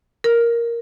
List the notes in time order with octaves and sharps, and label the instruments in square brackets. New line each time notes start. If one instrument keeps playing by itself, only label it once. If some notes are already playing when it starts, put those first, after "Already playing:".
[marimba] A#4